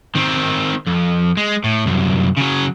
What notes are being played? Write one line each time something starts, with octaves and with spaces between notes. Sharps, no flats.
D#3 C4
F2
G#3
A2
C2 F#2
C#3 F#3